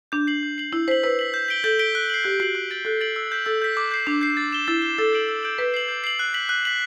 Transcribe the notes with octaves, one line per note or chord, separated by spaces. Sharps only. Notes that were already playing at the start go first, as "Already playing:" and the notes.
D4 G6
C7 F#7
G6
C7 F#7
E4 E6
C5 B6 F#7
B4 E6
B6 F#7
G6
B6 D7 G7
A4 G6
B6 D7 G7
F#6
C7 F#7
G4 F#6
F#4 C7 F#7
F#6
A6 D7 F#7
A4 F#6
A6 D7 F#7
E6
G6 B6
A4 E6
G6 B6
D6
G6 C7
D4 D6
G6 C7
A6
E7 G7
E4 A6
E7 G7
A4 E6
G6 D7 F#7
E6
G6 D7 F#7
B4 G6
C7 F#7
G6
C7 F#7
F#6
B6 F#7
F#6
B6 F#7